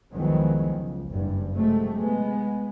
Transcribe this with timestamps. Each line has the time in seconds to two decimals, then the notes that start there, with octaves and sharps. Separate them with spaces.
0.14 C2 F2 D#3 F#3 G#3 B3
0.73 C#2
1.10 F#1 G2
1.54 C3 F#3 G#3 A3
1.97 G#3 B3